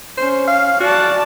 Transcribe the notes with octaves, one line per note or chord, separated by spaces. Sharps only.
C#4 C5
F5
F#4 D5 A5